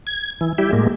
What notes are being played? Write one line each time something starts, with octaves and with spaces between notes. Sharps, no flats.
G#6
E3
G3 E4 G4
A2 G#3 A#3